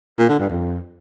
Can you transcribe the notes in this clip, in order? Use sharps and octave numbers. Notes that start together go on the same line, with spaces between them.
A#2
D3
G2
F2